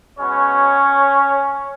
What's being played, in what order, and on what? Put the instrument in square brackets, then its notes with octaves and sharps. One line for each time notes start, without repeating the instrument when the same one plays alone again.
[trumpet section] G#3 B3 C#4 F#4 C#5